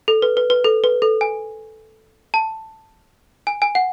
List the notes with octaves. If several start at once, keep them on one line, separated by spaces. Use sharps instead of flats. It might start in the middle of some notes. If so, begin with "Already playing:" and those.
A4
B4
B4
B4
A4
B4
A4
G#5
A5
G#5
G#5
F#5